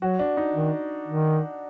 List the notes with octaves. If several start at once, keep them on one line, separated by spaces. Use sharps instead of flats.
F#3 F#4
D4
D#4
D#3
D#3